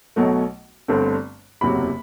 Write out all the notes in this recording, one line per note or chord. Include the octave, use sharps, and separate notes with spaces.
B1 B2 F#3 A3
G1 G2 D3 A3 C4
F#1 E2 C3 F#3 B5